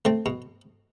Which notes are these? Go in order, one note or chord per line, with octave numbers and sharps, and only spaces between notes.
A3 C4
B2